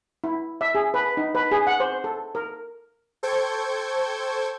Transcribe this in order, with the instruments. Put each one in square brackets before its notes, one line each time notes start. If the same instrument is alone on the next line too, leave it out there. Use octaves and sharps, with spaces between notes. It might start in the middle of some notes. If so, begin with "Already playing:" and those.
[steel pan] E4
E5
G#4
B4
D#4
B4
G#4
F#5
C5
A4
A#4
[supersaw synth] A4 C5 G5 C#6 G6 G#6